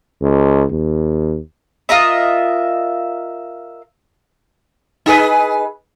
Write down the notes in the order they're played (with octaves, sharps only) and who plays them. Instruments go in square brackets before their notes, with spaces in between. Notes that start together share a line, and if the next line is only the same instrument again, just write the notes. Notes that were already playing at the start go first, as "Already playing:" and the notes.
[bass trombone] C#2
D#2
[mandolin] F4 A#4 D#5 E5
[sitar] D#4 G#4 B4